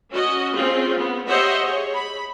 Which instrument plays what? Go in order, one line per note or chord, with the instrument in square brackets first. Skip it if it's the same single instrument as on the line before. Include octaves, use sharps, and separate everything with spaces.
[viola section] C#4 F#4 D#5
C4 C#4 F4 G#4
B3
G4 C5 C#5 D#5 E5 F#5
G#4 C#5
B5